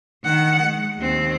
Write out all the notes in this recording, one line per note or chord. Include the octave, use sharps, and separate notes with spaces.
D#3 F#5
G#3
D#2 C4